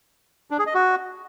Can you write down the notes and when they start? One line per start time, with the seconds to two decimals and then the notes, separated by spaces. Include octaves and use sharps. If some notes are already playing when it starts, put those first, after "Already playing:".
0.51 D4
0.59 G#4
0.67 D#5
0.74 F#4